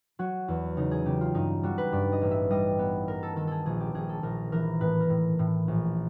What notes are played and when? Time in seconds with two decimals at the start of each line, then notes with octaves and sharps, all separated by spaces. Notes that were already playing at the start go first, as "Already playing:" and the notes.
0.19 F#3 F#4
0.48 E2
0.77 C#3 D#4
0.91 G#4
1.05 C#3 G4
1.21 F4
1.34 G2 D#4
1.63 G3 F#4
1.78 B4
1.92 G2 D5
2.12 D#5
2.21 A1
2.31 E5
2.50 G3 D#5
2.79 B3
3.08 B3 A#4
3.23 A4
3.36 D#3 A4
3.47 G#4 A4
3.66 A#1 G#4
3.80 G4
3.94 A#1 G#4
4.09 A4
4.23 A#1 A#4
4.52 E3 A#4
4.80 A2 B4
5.00 A#4
5.09 A2
5.39 A2
5.68 A#1